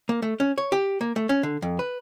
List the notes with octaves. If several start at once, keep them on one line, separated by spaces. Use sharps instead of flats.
A#3
A3
C#4
C#5
G4
A#3
A3
C#4
D3
F2
B4